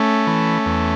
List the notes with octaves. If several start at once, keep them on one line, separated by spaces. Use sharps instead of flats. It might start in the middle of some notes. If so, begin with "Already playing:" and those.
Already playing: A3 C#4
E3
E2